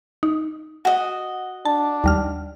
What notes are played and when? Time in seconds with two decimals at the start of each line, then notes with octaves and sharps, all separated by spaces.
0.23 D#4
0.85 F#4 D#5
1.65 D4 A5
2.04 D#2 G3 F6